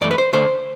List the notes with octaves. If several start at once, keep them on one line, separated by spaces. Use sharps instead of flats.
F#2 E3 A3 D5
B4
C5
D2 D3 A3 C5